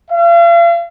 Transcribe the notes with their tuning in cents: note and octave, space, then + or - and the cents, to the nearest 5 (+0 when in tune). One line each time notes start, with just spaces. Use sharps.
F5 -40